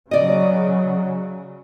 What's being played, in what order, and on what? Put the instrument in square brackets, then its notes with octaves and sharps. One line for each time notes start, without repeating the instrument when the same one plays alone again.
[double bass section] C#3 F#3 [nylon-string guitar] D5 D#5